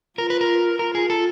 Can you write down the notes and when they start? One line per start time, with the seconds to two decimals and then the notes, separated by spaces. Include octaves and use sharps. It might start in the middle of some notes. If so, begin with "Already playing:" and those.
0.18 F4 A#4
0.30 B4
0.41 A#4
0.79 F4 A#4
0.95 G#4
1.10 A4